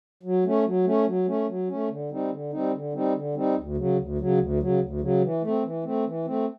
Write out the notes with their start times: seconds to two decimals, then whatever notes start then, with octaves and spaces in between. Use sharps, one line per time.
0.23 F#3
0.44 A3 C#4
0.65 F#3
0.84 A3 C#4
1.05 F#3
1.26 A3 C#4
1.47 F#3
1.68 A3 C#4
1.89 D3
2.10 G3 C4 D#4
2.30 D3
2.51 G3 C4 D#4
2.73 D3
2.93 G3 C4 D#4
3.14 D3
3.34 G3 C4 D#4
3.56 D2
3.76 C#3 F#3
3.97 D2
4.18 C#3 F#3
4.38 D2
4.59 C#3 F#3
4.80 D2
5.01 C#3 F#3
5.22 E3
5.42 A3
5.47 C4
5.63 E3
5.84 A3 C4
6.05 E3
6.25 A3 C4